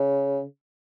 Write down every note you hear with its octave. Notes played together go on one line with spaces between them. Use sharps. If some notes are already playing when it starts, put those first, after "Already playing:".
Already playing: C#3